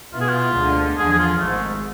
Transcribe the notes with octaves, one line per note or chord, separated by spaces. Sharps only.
B2 B3 E4 F4
G#4
F4
D2 D3 G#3
E2 D3 F3 G#4
G#4
F4
G#1 G#2 G#3 A3